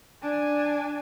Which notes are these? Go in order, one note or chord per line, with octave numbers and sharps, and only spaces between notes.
D4 G#5